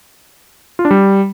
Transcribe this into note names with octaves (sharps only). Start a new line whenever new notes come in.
F4
D4
G3